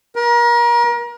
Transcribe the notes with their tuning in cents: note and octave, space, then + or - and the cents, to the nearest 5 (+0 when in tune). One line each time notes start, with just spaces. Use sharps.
A#4 +35